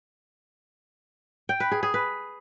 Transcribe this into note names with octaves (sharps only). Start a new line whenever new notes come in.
G5
B4
G#4
G#4
B4